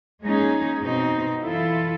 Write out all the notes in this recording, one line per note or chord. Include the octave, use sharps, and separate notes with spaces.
G#3 A#3 C#4 D#4 G#4
B2 C4 D#4
E3 E4 F4 A4